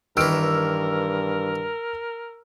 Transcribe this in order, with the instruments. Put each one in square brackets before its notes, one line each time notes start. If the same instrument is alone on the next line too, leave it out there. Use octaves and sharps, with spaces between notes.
[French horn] G2 [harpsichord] D#3 E3 [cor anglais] A#4 [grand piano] E6 F6 D7